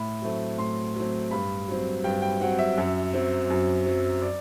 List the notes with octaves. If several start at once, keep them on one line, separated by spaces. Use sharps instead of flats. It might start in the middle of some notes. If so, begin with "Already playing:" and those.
Already playing: A2 B5
F#3 A3 C4
A2 C6
F#3 A3 C4
G2 B5
F#3 C4
G2 G5
G5
F#3 C4 F#5
E5
F#2
F#3 C4
F#2
F#3 C4
D5